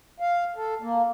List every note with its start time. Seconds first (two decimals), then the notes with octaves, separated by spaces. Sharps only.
0.20 F5
0.56 A4
0.82 A#3